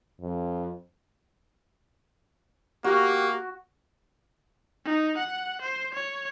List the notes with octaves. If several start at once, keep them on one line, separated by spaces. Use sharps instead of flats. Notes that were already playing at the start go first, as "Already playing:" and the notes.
F2
A#3 F#4 G4
D#4
F#5
C5
C#5